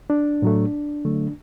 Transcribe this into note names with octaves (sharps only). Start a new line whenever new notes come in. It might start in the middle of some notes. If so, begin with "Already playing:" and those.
D4
A2 F#3 A3
D3 F#3 A3